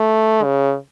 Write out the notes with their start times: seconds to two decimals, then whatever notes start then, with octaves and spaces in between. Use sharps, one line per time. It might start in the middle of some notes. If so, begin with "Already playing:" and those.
Already playing: A3
0.44 C#3